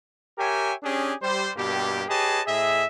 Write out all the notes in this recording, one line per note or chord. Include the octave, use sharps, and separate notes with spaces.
G4 A#4 C#5 E5 G5 G#5
C#4 D4 G4 G#4
G3 C5
G2 B2 A#3 G4
G4 G#4 B4 C#5 D#5 A5
A2 G#4 D#5 E5